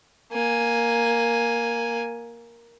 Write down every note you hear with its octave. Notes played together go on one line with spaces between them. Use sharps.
A#3 G#5